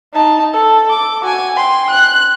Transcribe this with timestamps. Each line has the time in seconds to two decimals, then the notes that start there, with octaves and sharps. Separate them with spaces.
0.13 D#4 A5
0.53 A4
0.90 D6
1.22 F#4 G#5
1.55 G5 C6
1.90 F#6